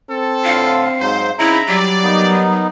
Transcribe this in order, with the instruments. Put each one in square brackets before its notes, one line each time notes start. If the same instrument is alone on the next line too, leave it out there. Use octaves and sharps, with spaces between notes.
[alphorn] C4 [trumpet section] A4
[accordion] A2 D3 F4 [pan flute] F5
[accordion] G#2 F#3 [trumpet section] C5
[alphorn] C#3 [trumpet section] C4 D#4 [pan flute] E4 [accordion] E5 A#5 B5
[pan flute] F#3 [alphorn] G3 [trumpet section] F#4 D5
[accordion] A#3 B3 D#4